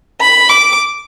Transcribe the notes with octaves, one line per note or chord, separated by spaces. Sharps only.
B5
D6